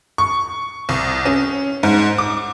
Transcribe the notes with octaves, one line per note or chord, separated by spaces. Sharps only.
C#6
C2
C#4
G#2
D6